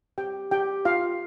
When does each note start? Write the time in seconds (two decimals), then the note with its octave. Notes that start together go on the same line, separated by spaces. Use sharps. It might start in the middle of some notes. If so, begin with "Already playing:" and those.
0.18 G4 G5
0.51 G4 G5
0.85 F4 F5